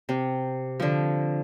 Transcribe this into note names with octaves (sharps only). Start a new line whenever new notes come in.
C3
D3 F3